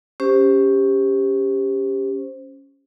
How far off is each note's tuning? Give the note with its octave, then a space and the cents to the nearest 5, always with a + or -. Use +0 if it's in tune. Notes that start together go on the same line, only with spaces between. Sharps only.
C#4 +0 G4 +10 C5 +0